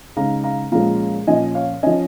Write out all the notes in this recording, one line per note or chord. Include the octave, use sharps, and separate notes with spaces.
C#3 G#3 D#4 F5 A#5
F5 A#5
A#2 F3 G#3 C#4 F5 A#5
A#2 F3 C#4 D#5 G#5
C#5 F5
F3 C#4 D#5 G#5